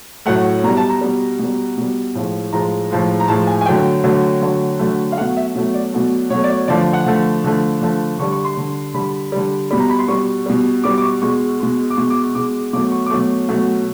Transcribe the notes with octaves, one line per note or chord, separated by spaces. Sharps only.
A2 F#3 A3 F#5
B2 G3 A#5
A5
A#5
B2 G3
B2 G3
B2 G3
A2 F3 G#3
A2 F3 G#3 A#5
A2 F3 G#3
A#5
A2 F3 G#3 A5
G#5
G#5
D3 F#3 A3 G5
D3 F#3 A3
D3 F#3 A3
D3 F#3 A3
F5
B2 F#3 A3 F#5
E5
B2 F#3 A3
D5
B2 F#3 A3
B2 F#3 A3 C#5
D5
C#5
D3 F3 A3 D5
F#5
D3 F3 A3
D3 F3 A3
D3 F3 A3
D3 G3 C#6
C#6
C6
D3 G3
D3 G3 B5
D3 G3
B2 G3 B5
A#5
B5
C6
B2 G3 C#6
B2 G3
B2 G3 D6
D6
C#6
B2 G#3 C#6
B2 G#3
D6
B2 G#3 C#6
D6
C#6
B2 G#3 D6
B2 F#3 A3 D6
C#6
D6
B2 F#3 A3 C#6
B2 F#3 A3